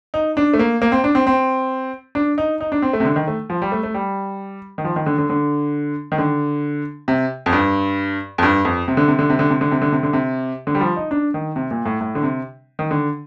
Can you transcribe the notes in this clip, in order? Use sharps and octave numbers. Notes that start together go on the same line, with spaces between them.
D#4
D4
A3
A#3
A#3
C4
D4
C4
C4
D4
D#4
D#4
D4
C4
A3
C3
D3
D#3
A3
F3
G3
A3
A3
G3
D#3
F3
D#3
D3
D3
D3
D#3
D3
C3
F2
G2
F2
G2
F2
C3
D3
C3
D3
C3
D3
C3
D3
C3
D3
C3
D3
C3
D3
G3
F3
D#4
D4
D#3
C3
A#2
A2
A2
D3
C3
D#3
D3